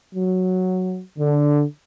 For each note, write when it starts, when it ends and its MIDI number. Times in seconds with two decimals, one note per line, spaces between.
0.14 0.98 54
1.18 1.62 50